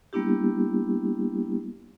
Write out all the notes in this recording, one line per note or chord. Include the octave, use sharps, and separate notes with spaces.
G3 A#3 B3 D4 E4 G4